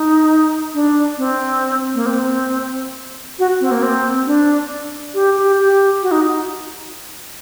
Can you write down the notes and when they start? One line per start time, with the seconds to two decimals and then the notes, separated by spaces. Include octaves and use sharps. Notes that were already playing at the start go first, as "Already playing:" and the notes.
Already playing: D#4
0.74 D4
1.18 C4
1.95 A#3
2.06 C4
3.39 F#4
3.61 C4
3.72 A#3
3.83 C4
4.26 D4
5.14 G4
5.37 G4
5.59 G4
6.03 F#4
6.11 D#4